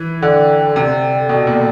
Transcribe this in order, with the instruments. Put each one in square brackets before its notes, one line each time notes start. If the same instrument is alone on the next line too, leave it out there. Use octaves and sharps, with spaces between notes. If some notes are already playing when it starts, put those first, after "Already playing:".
Already playing: [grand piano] E3
[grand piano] D3 [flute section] A4 D5 G5
[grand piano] C3 [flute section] A4 D5 G5
[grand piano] B2 [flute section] A4 D5 G5
[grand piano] A#2